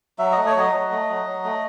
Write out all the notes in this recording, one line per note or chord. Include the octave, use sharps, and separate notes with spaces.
F#3 E5
A3 D#5
C#5
F#3 D#5
F#3
A3
F#3
F#3
A3